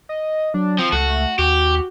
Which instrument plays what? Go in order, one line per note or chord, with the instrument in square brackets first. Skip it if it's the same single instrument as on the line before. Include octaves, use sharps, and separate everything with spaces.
[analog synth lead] D#5
[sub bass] F#3 [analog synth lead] D4
[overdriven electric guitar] F3 [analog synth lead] C4
[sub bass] C#2 [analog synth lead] A3 [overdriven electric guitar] F#4
[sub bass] D#2 [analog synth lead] F#4 [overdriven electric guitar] G4